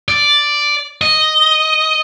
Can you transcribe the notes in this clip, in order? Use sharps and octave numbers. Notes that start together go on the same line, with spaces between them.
D5
D#5